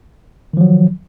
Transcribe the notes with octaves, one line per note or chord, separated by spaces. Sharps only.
D#3 F3 F#3